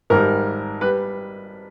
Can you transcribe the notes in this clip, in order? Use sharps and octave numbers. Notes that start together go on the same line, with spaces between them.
G#1 G#2 G3 A#4
G3 B4